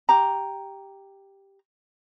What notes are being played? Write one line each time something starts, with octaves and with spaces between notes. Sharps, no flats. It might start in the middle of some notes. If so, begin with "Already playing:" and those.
G4 A#5